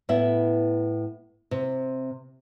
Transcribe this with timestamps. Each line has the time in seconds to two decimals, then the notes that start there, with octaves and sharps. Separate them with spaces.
0.09 A2 B3 E4 E5
1.51 C3